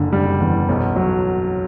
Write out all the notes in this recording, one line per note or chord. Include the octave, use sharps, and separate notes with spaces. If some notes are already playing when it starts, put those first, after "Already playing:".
Already playing: F#1 D3
G3
E2
B1
F#3